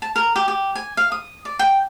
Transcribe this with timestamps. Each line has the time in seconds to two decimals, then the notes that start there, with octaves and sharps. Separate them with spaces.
0.02 A5
0.16 A#4
0.36 G4
0.48 G4
0.75 G#5
0.97 F5
1.12 D#6
1.45 D5
1.59 G5